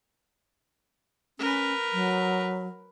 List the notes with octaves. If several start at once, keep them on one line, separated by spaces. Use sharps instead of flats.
C#4 A#4 B4
F#3